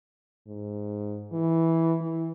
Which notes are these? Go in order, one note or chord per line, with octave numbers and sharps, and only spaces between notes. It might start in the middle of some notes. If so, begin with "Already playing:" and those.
G#2
E3
E3